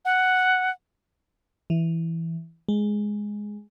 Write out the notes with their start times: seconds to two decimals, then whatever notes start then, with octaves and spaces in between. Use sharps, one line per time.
0.05 F#5
1.70 E3
2.69 G#3